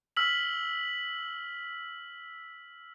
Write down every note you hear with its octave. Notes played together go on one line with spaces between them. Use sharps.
E6 F6 B6 F#7